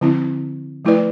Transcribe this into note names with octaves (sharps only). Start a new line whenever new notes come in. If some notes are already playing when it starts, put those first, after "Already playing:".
D3 F3 C4 E4
F3 A3 E4 B4 D5